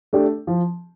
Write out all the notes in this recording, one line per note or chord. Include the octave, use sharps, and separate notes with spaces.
A3 D4 G4
F3